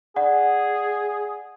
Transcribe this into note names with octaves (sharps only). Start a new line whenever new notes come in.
G#4 D5 F#5